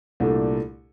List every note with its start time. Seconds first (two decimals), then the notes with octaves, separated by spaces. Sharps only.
0.20 C2 A#2 A3 D4 A4